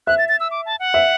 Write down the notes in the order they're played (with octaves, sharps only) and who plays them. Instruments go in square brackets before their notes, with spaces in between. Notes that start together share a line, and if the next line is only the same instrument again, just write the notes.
[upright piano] E5 [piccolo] F#6
[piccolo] A6
A6
E6
D6
A5
F#5
[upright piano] E5